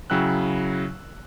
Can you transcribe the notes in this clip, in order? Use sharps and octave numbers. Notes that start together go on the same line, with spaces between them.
C#3 F#3 E4 G5 E6 F#6